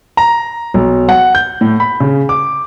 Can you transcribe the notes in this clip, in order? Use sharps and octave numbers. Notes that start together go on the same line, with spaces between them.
A#5
B1
F#5
G6
A2
B5
C#3
D6